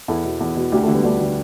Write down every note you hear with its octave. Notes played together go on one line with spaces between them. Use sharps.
E2 E4 A4
B2
E2
B2
D2 D4 G4
D3 A3
G3 B3
D2 A3 D4
D3